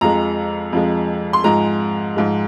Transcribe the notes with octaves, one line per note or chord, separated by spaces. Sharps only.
F2 F3 G#3 A#5
F2 F3 G#3
C6
G#2 F3 G#3 A#5
G#2 F3 G#3